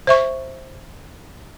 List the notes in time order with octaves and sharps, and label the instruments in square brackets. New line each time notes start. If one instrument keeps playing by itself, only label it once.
[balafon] C5 E5 C#6